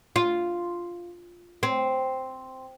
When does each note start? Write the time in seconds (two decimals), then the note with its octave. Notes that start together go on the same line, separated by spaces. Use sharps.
0.16 F4
1.63 C4